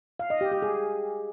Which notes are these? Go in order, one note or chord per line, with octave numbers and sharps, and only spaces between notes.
F5
D#5
G4
G4
G#4